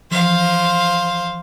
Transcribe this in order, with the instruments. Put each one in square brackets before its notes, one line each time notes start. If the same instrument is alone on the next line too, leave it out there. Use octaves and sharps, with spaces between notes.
[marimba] E3 F3 [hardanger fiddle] C5 F5